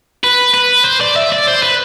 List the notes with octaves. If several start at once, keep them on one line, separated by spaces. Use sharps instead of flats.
B4
B4
C5
D5
E5
D5
C5
B4